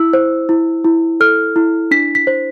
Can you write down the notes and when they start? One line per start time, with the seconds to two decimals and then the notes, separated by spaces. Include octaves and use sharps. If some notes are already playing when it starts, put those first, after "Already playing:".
Already playing: E4 E6
0.13 C5
0.49 E4
0.84 E4
1.20 A4 F6
1.56 E4
1.91 D4 B6
2.15 B6
2.27 C5